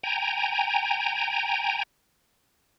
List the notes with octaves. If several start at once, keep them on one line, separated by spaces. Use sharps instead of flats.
G5 G#5 A#5